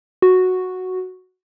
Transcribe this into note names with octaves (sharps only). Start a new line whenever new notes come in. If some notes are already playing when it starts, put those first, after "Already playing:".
F#4